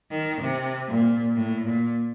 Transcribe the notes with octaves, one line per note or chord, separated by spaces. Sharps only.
D#3
C3
A#2
A2
A#2